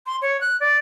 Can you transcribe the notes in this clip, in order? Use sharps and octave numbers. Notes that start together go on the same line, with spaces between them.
C6
C#5
F#6
D5